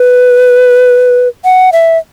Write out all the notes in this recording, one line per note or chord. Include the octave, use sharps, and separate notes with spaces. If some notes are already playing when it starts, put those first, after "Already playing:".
Already playing: B4
F#5
E5